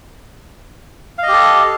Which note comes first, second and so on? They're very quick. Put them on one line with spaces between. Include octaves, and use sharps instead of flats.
F5 D#5 G4 A4